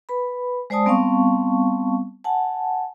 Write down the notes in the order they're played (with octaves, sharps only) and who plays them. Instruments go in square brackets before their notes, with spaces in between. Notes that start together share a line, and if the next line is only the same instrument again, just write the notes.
[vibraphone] B4 B5
G#3 C5 D5 G#5 A5 D#6
G3 B3 C4 F5 A5 C#6
F#5 G#5 A5